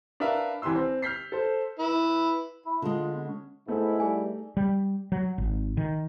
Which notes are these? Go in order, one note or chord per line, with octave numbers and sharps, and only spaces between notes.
D4 A#4 B4 E5 F5
C2 E3 G4 B4 C6 E6
C4
F6 G6 B6 C7
A4 C5
E4 B4
E4
D3 G#3 F4
B3
C#4
G#2 A3 B3 D#4 E4
G3 G#4 G#5
G3
F#3
G#1
D#3